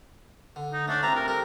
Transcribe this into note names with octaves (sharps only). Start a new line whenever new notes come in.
D3
D#4
A3 C#4 D4
C2 C4 F4 A#5
A#4
G4 A4 A#4